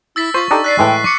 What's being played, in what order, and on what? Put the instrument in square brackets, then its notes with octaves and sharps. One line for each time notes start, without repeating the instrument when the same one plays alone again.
[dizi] E4 [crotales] E6 A6 B6
[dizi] F4 [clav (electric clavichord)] C5 [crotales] C#6 B6
[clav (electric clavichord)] D4 D#4 G4 [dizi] A4
[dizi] D5 [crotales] F#6 B6 C7
[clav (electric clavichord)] A2 E3 G#3 [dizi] G5
[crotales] C#6 C7 C#7 [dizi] D6